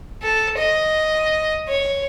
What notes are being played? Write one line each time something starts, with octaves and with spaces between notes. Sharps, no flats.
A4
D#5
C#5